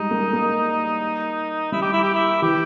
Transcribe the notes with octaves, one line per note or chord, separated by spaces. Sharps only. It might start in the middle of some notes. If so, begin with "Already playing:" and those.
Already playing: G3 G#3 D#4
A#3
A#3
G3 E4
G4
E4
G4
E4
E3 G4